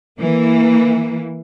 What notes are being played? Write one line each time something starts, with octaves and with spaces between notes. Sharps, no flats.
E3 A#3